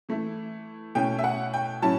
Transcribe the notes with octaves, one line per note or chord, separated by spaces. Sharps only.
E3 A3 E4
B2 A3 C#4 E4 G5
E5
F#5
G5
A2 F#3 C#4 E4 A5